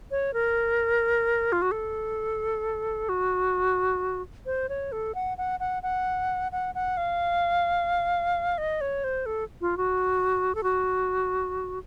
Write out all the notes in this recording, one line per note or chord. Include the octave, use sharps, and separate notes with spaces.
C#5
A#4
F4
F#4
A4
F#4
C5
C#5
A4
F#5
F#5
F#5
F#5
F#5
F#5
F5
D#5
C#5
C5
A4
F4
F#4
A4
F#4